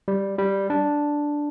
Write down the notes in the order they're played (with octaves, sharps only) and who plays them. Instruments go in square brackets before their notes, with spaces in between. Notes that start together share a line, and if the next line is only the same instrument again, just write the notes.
[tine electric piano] G3
G3
D4